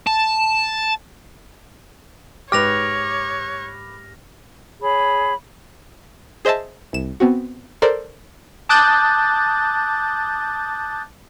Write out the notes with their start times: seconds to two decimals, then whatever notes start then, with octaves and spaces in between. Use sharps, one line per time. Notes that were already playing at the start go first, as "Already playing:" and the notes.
0.07 A5
2.52 G#2 G4 B4 C#5 D6 F6 A#6 F7
4.81 G#4 C#5 B5
6.45 G#4 C5 D#5 E5 A5
6.93 C2 E7
7.20 B3 C4 F#4
7.82 A4 A#4 C5 D5
8.69 A5 D6 D#6 F#6 G6 A6